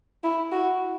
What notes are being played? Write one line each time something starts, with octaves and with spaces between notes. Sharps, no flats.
E4
F#4